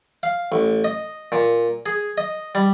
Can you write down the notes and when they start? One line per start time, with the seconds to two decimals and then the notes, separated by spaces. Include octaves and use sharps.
0.23 F5
0.52 A1
0.84 D#5
1.32 A#2
1.86 G#4
2.18 D#5
2.55 G3